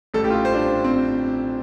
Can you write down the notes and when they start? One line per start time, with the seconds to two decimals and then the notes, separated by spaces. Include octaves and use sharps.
0.14 A1 A2 G3 A4
0.24 G4
0.30 F4
0.35 G4
0.45 C5
0.54 D4
0.84 C4